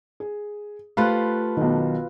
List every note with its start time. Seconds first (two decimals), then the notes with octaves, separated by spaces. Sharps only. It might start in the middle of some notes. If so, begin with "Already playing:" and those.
0.20 G#4
0.97 A3 F4 G4 B4 C5 F5 B5 F#6
1.57 B1 D#3